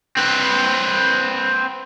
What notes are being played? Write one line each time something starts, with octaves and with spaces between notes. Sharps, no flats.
C4 B4